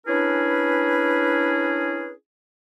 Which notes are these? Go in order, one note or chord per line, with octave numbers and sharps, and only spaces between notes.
C#4 D4 E4 G#4 A#4 B4